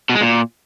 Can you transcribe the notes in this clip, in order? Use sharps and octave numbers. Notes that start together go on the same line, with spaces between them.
B2
G#3
A#2